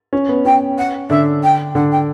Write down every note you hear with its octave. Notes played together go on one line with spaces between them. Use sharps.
C#4
B3
C#4 G5
F#5
D3 D4 E5
G5
D3 D4 F#5
G5